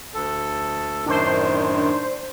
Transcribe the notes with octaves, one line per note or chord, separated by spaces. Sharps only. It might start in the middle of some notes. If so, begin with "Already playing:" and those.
D2 A4
F#2 A2 D#3 D4 C5